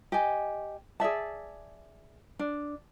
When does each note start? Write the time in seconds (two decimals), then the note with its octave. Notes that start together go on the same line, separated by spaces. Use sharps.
0.12 G4 D#5 G#5
1.00 G#4 D5 E5 A5
2.39 D4